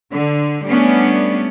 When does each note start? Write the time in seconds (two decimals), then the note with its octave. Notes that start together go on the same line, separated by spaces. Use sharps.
0.12 D3
0.66 G3 A3 B3 C#4 D4